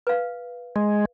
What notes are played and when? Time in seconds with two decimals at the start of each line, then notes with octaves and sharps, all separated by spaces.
0.07 B4 F5
0.76 G#3